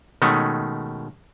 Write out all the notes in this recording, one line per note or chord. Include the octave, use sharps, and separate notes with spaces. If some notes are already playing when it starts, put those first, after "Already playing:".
B2 D#3 G#3 A3 C#4